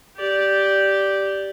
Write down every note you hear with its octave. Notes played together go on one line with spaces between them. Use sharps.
G4 D5